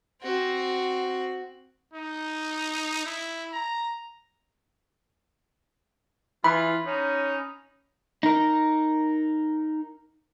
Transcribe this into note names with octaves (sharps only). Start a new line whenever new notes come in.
C4 F#4
D#4
E4
A#5
E3 F4 B5
C#4 D#4
D#4 A#4